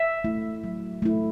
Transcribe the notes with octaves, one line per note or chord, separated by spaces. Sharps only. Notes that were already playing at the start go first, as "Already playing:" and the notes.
Already playing: E5
A3 E4
F#3
A3 E4